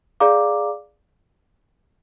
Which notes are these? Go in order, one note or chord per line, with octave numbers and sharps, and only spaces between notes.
G#4 D5 F5 A#5 D6